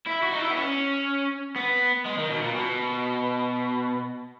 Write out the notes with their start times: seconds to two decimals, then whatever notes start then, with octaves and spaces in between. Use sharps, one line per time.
0.07 E4
0.23 F#4
0.32 D#4
0.40 E4
0.51 B3
0.57 C#4
1.56 B3
2.06 G#3
2.18 D#3
2.30 B2
2.42 A#2
2.55 B2